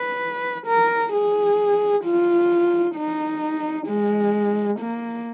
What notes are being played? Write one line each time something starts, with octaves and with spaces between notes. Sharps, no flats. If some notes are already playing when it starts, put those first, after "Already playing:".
Already playing: B4
A#4
G#4
F4
D#4
G#3
A#3